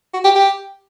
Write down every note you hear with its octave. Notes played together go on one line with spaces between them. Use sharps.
F#4
G4
G4